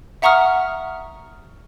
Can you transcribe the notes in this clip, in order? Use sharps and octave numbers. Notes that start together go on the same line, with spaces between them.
E5 F#5 A#5 C#6 D#6 F6